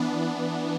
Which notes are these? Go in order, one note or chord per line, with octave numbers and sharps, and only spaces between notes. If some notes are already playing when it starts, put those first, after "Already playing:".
Already playing: E3 B3 D4